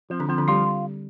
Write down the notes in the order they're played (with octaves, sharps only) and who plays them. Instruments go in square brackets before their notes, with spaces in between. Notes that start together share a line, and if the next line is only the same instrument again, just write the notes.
[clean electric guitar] F3 [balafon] C4
[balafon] D3 D4
[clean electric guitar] F3 [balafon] C4
[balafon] D3 D4
[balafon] G3 G4 [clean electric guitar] F4